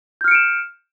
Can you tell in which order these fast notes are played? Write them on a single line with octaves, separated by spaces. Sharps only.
G6 F6 C#7 D7 E7